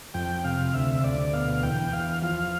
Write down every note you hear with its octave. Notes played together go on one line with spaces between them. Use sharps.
F2 G5
C3 F5
D2 E5
D2 D5
B2 F5
E2 G5
E2 F5
F3 F5